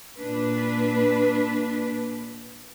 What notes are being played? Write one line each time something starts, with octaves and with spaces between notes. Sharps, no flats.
A#2 D4 B4